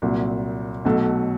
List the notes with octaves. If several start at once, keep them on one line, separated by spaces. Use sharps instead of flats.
C2 A#2 F#3
B1 B2 F#3 A3